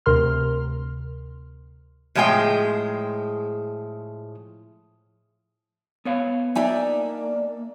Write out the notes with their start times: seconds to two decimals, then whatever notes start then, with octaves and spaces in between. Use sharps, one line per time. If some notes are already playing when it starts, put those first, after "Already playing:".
0.06 D2 C3 A#4 C6 F6
2.15 A2 F3 G#3 G#4 G5
6.05 B3 C#5 F5
6.55 A#3 D4 D#4 D5 E5 G#5 A#5